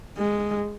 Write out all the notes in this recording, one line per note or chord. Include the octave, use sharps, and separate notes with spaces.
G#3